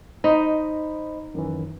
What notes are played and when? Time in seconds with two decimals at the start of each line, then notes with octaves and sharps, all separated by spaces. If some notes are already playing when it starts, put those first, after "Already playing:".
0.24 D#4 C5 D#5 B5
1.34 F#2 D#3 E3